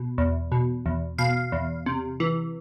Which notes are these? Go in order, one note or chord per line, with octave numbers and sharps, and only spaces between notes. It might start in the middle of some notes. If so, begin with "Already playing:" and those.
Already playing: B2
E2
B2
E2
B2 F5
E2
C3
E3